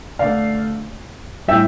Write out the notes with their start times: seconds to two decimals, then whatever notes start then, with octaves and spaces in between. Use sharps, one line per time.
0.19 D3 A3 D5 F5
1.48 A2 G3 E5 G5